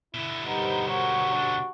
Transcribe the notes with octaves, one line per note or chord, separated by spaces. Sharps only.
B2 D3 E4
G3 B3 D#4 A#4 C5
F#4 C#5
D4